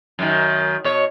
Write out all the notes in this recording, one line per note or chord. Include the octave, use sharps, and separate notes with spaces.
F#2 D#3
B2 C#5